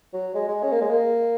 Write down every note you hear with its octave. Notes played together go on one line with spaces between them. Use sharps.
F#3
G#3
G#3
C#4
A#3
G#3
A#3